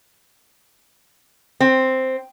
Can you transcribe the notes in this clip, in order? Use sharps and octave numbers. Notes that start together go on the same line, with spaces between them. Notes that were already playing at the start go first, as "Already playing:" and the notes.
C4